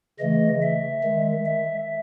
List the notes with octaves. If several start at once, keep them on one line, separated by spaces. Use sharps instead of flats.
C#3 E3 A3 D#5
E5
D#3 G#3
E5